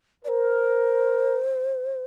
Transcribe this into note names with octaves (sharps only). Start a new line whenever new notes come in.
A#4 C5 D5